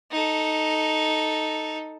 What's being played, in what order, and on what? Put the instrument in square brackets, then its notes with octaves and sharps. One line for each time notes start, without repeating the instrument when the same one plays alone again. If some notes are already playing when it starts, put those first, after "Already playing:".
[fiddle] D#4 A4